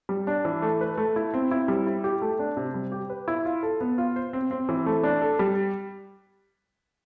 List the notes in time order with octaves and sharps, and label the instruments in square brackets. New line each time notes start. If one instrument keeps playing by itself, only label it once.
[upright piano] G3
D4
E3
A3
B4
A3
E4
C4
E4
G3
E4
G4
A3
D4
C3
G3
G4
B4
E4
F4
A4
B3
F4
C5
C4
C4
E3
A3
D4
A4
G3